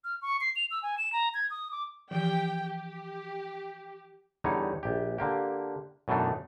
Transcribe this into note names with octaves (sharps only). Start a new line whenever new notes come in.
F6
C#6
C7
F7
E6
G#5
E7
A#5
G#6
D#6
D6
E3 F3 G4 G5
G4
E2 D3 G3 D#4 C#5
A#1 G4
D3 A#3 G4
F#2 B2 E3 A3 D4 D#4